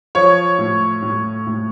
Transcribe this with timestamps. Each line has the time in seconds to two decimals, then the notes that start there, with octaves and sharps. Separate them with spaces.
0.15 F3 C#5
0.59 A2
1.02 A2
1.47 A2